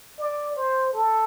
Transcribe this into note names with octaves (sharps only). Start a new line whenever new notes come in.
D5
C5
A4